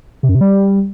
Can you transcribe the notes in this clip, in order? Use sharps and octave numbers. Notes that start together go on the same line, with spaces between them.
C3
F#2
C3
G3